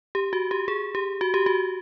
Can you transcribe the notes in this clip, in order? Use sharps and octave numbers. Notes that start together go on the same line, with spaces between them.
G4
F#4
G4
G#4
G4
F#4
G4
F#4